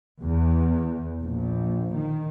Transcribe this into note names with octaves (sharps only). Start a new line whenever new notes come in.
E2
A#1
D#3